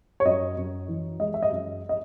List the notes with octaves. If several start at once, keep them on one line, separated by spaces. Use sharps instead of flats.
C#5
F#2 D#5
F#2
E3
G#3 D#5
E5
D#5
F#2
D#5